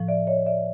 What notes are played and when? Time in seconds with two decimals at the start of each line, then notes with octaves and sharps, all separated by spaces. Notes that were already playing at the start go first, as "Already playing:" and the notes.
Already playing: A2 F3
0.08 D5 E5
0.27 C#5 D#5
0.46 D5 E5